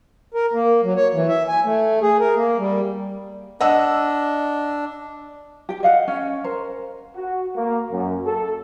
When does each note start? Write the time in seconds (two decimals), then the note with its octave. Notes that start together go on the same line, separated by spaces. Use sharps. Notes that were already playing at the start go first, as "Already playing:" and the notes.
0.34 A#4
0.53 A#3
0.83 F#3
0.96 C#5
1.14 E3
1.29 E5
1.48 G#5
1.65 A3
2.02 G#4
2.20 A#4
2.36 A#3
2.58 G3
3.60 D4 D#5 F#5 E6
5.69 G4 G5
5.83 D#5 F5 F#5
6.08 C#4
6.44 A#4 C5
7.15 F#4
7.56 A#3
7.91 F#2
8.26 A4